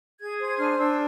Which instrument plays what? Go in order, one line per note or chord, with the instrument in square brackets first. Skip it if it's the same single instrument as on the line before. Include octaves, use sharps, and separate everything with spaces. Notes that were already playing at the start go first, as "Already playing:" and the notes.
[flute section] G#4 G#6
C5 G#6
D4 F6
D4 E6